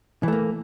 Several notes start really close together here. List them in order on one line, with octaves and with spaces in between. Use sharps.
E3 A3 A#3